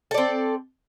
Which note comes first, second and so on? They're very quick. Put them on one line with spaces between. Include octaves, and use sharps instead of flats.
A4 D5 C4